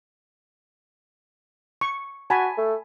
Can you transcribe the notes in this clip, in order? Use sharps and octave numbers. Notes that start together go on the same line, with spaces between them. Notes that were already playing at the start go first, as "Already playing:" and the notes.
C#6
F#4 G#5 A5 B5
A3